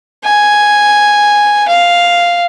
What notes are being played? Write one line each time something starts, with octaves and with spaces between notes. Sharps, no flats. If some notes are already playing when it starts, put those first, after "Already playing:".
G#5
F5